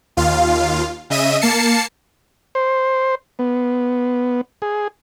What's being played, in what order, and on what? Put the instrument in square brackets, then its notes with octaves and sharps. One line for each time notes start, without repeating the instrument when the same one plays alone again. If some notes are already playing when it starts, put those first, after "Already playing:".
[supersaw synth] D#2 F4 F5
C#3 D#5 E5 D#7
A#3 A5 C7 C#7
[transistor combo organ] C5
B3
G#4